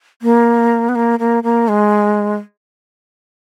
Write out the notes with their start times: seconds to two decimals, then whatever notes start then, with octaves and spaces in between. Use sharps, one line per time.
0.22 A#3
0.89 B3
0.95 A#3
1.19 A#3
1.43 A#3
1.68 G#3